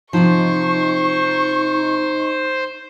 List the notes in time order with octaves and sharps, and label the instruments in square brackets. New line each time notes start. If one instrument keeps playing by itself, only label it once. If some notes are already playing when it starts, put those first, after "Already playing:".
[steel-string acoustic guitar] C3 F3 [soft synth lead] D#4 [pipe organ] C5 [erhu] C#6